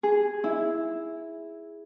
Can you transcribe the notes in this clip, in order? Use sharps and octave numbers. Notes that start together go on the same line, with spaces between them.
G#4
E4